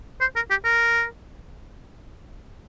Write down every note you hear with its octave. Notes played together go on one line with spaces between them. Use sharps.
C5
A#4
G4
A#4